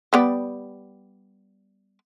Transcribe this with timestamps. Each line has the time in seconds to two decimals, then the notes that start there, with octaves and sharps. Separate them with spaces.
0.13 G3 B3 D5